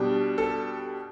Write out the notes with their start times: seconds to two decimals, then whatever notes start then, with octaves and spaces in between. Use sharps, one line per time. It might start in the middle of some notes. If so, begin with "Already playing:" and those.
Already playing: B2 G3 D4
0.38 A4